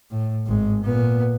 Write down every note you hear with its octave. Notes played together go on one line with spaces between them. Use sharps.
A2
G#1 G#3
A#2 B3